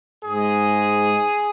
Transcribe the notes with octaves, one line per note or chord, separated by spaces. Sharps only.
G#2 G#3 G#4